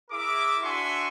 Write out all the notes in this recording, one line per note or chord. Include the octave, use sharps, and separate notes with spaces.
E4 G#4 A#4 E5 D6
D4 F#4 E5 G#5 C6 C#6